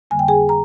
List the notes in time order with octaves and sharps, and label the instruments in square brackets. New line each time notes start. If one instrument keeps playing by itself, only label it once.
[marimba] F2 D3 G3 A#3 G#5
G5
G#4 G#5
A#5